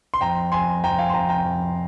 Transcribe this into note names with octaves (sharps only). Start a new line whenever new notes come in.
C6
F2 G5 A#5
F2 G#5 C6
F2 G5 A#5
F5 G#5
C6
F2 G5 A#5
G5 A#5
F2